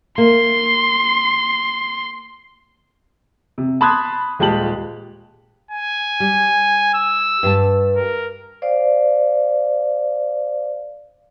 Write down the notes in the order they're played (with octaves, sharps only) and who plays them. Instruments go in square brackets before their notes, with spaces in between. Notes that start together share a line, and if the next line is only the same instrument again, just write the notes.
[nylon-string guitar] A#3 [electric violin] C6
[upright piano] C3
A5 B5 C6 D#6 F#6 G#6
D#1 G#3 F4 G4 A5 F#7
[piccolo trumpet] G#5
[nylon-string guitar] G3
[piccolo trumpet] E6
[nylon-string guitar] G2 G3 A5
[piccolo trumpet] A#4
[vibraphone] C5 D5 F5